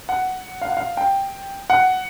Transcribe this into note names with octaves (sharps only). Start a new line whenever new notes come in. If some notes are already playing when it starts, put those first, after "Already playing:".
F#5
F5
F#5
F5
G5
F#5